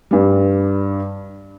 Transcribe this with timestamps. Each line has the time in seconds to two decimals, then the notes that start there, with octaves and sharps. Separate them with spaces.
0.11 G2 G3